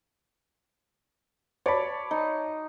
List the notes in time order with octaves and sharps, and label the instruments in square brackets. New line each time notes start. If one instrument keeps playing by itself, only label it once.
[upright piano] C#5 A5 B5 [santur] D5
[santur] D#4